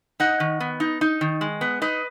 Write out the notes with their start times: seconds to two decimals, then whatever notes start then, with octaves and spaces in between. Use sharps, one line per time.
0.20 D#4 D#5 F#5
0.40 D#3
0.60 B3
0.80 D#4
1.01 D#4
1.21 D#3
1.41 G#3
1.61 B3
1.81 D#4 B4 D#5